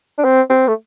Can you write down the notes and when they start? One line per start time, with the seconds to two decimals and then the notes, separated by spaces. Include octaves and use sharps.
0.18 D4
0.24 C4
0.50 C4
0.68 A3